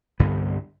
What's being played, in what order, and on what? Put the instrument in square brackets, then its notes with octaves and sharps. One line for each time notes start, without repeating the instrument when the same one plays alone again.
[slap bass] C2 G2 D3 B3